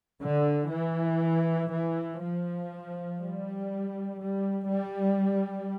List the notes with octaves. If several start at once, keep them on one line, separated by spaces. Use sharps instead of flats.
D3
E3
E3
F3
G3
G3
G3